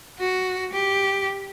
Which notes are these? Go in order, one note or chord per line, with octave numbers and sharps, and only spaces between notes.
F#4
G4